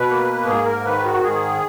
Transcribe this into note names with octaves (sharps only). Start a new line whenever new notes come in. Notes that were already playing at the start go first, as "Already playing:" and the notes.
Already playing: B2 B4
A#3
G#2 G#4
A#4
D#3 B4
F#4
G#2 G#4